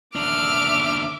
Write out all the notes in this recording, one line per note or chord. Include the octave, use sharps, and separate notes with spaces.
D#2 D4 E5 D6 F6